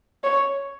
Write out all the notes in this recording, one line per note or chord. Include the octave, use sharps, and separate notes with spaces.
C#5